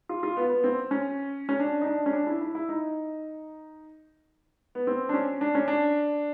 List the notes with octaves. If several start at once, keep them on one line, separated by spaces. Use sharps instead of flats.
F4
F4
B3
B3
C4
C#4
C#4
D4
D#4
D4
C#4
D4
E4
E4
E4
D#4
B3
C4
D4
C#4
D4
C#4
D4